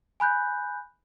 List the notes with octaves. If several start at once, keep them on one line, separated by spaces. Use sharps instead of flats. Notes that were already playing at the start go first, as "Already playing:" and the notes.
G#5 B5 F#6 G6